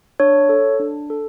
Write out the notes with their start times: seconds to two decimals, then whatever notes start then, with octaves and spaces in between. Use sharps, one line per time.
0.20 D4 C#5
0.49 A4
0.80 D4
1.10 A4